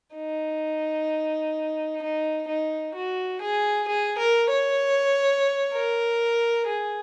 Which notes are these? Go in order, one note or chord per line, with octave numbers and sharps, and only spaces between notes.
D#4
D#4
D#4
F#4
G#4
G#4
A#4
C#5
A#4
G#4